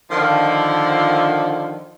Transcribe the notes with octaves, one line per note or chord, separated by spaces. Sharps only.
D3 D#3 F3